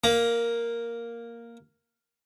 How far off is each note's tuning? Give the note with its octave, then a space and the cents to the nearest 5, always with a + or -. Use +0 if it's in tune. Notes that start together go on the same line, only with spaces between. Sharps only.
A#3 +0 A#5 +30